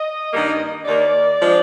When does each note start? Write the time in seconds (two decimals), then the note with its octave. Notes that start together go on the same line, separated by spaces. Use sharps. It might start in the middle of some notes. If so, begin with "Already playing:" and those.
Already playing: D#5
0.32 G2 D#3 G3 A#3
0.85 D#2 D#3 A#3 D5
1.39 F3 G#3 D4